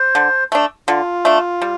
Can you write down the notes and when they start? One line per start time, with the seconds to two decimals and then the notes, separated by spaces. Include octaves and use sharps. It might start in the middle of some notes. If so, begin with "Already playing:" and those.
Already playing: C5
0.15 D3
0.52 A3 D4
0.88 D3 F4
1.25 A3 D4
1.62 G3